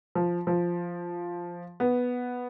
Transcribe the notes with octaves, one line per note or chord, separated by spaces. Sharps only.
F3
F3
B3